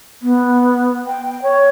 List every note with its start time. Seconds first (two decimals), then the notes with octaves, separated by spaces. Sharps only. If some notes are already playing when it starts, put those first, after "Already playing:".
0.22 B3
1.07 G5
1.43 C#5